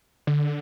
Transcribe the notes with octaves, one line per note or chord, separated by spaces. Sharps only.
D3